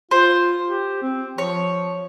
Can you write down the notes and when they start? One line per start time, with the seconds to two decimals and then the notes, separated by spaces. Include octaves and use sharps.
0.11 F4 C5
0.68 G4
1.02 C4
1.38 F3 C#5